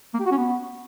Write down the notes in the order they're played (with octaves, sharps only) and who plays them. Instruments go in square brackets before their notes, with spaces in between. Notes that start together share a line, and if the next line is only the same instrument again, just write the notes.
[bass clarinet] A#3
G4
F#4
C#4
B3